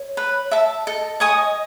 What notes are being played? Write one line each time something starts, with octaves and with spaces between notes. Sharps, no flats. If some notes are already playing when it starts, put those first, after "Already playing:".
Already playing: C#5
B4
E5 A5
A4 D#5
C#5 G#5 D#6